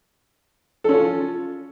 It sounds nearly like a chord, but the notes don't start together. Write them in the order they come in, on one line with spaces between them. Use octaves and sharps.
A4 C#4 F4